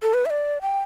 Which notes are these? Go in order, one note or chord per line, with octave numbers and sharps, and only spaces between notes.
A4
B4
E5
D5
G5